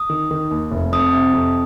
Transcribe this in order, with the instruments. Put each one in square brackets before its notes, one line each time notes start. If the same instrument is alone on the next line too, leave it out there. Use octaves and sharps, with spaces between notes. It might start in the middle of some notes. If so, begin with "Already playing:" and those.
Already playing: [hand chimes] D#6
[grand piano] D#3
D#3
D#2
F1
[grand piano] F2 [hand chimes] D#6
[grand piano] C3
F2